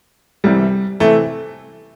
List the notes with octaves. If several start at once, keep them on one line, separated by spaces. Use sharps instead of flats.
C2 C3 E3 G3
C3 E3 A3